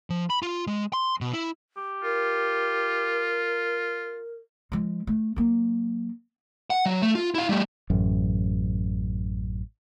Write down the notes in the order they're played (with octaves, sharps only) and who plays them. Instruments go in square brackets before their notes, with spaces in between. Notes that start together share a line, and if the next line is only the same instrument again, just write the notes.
[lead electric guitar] F3
B5
F4
G#3
C6
B2
E4
[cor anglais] G4
[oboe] F4 [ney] A#4
[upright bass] F3 G#3
A3
F#3 A#3
[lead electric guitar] F#5
F#3
A3
F4
E4 F5
G3 A3
[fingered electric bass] A1 F#2